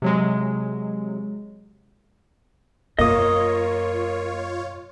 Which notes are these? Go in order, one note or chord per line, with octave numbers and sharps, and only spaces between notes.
C3 F#3 G#3
F#2 B2 A#3 F4 C#5 D#5 D#6